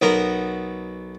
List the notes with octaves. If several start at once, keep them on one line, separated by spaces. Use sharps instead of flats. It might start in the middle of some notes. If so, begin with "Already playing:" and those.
B1 B3 F#4 A#4 A#5